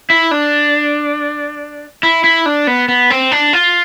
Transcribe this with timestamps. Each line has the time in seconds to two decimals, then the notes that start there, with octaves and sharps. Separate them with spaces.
0.10 E4
0.31 D4
2.03 E4
2.24 E4
2.46 D4
2.67 B3
2.88 B3
3.10 C4
3.31 D4
3.53 F4